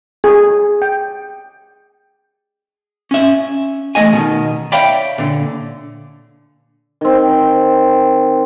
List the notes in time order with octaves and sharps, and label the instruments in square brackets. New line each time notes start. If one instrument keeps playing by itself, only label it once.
[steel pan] G#4
G5
[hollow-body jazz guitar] C#4 E5
E2 A3 D#5 G#5
B2 D#3
C#5 D5 E5 F5 G5 B5
A#2 D3
[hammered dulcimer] D#3 C4